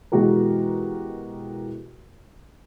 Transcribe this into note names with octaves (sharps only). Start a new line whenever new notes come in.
B2 E3 G#3 F#4 G4 A#4